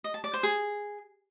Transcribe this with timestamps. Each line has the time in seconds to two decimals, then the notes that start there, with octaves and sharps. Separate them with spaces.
0.04 D#5
0.14 A5
0.24 D5
0.34 C5
0.43 G#4